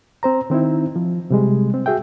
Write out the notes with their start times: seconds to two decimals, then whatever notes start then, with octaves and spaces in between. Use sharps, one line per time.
0.23 C4 C5 A#5
0.50 D#3 C4 D#4 E4
0.96 F3
1.30 C3 G3 G#3
1.74 C4
1.86 F#4 G#4 E5 G5